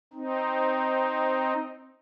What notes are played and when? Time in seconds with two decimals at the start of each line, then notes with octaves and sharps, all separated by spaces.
0.13 C4 D#4